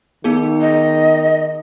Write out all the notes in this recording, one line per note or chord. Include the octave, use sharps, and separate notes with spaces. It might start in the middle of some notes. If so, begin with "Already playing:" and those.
D#3 B3 D#4 G#4
D#5